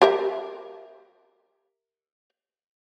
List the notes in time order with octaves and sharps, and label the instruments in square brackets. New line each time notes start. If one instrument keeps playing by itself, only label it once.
[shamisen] G4 A#4 E5